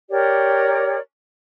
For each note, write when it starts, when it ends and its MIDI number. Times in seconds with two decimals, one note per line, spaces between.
0.09 0.97 67
0.09 0.97 70
0.09 0.97 73
0.09 0.97 74